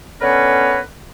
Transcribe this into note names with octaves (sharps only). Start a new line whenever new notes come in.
D3 B3 C#4 A#4 B4 C#5